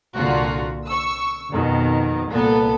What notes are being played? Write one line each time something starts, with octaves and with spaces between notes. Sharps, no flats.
C2 A#2 D3 F4 F#4
C#6 E6
F2 B2 D#3
C2 A#2 B3 A4